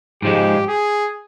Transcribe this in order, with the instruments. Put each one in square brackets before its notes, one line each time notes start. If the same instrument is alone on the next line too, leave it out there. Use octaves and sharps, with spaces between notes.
[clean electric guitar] G#2 F3 G#3 [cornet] G4
[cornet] G#4